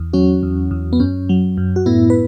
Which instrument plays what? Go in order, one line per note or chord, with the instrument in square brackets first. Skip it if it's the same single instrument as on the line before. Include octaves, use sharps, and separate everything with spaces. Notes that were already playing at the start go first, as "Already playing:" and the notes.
Already playing: [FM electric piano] E2
F#3 C#4 F#4
E2
E2
B3
F#2 C#4
F#3
F#2
F#4
A2 B3 E4
B4